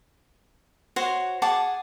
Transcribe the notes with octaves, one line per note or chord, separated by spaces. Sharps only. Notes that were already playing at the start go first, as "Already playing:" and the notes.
F#4 C5 C#5
G#4 F#5 A5 D6